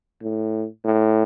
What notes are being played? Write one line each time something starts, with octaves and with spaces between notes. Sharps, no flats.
A2
A2